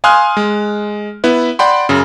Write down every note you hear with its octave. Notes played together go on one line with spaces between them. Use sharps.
F5 G#5 C6 D#6 F6 F#6
G#3
B3 E4 B4
D5 F#5 G5 B5 C6
F#2 C#3